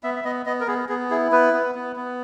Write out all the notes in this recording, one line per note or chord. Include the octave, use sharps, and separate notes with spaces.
B3 E5
E5
B3 D#5
B3 D#5
A#4
B3 G#4
B3 G#4
E4 G#4
B3 B4
B3
B3
B3